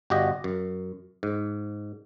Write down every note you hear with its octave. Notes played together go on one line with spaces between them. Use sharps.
G1 F#4 G4 D#5
F#2
G#2